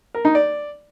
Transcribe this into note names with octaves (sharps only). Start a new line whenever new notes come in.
A#4
D#4
D5